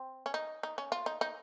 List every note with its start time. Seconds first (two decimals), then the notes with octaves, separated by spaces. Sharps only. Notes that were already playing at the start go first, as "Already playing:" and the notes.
Already playing: C4
0.26 C#4
0.34 D#4
0.63 D#4
0.78 C#4
0.92 F4
1.06 D#4
1.21 D#4